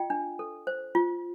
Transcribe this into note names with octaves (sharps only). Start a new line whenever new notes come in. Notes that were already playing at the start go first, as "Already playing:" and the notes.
Already playing: F4 D#5 G5
D4
A4
C5
F4